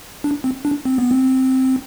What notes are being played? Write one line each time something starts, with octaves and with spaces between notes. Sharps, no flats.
D4
C4
D4
C4
B3
C4